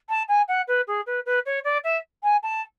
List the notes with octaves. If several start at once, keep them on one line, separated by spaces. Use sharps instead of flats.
A5
G#5
F#5
B4
G#4
B4
B4
C#5
D5
E5
G#5
A5